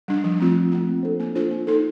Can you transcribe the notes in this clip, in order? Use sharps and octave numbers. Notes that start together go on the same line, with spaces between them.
G3 D4
F3
A3 C4 F4
F3
A3 C4 F4
A#3
D4 F4 A4 C5
A#3
D4 F4 A4 C5
A#3
D#4 A4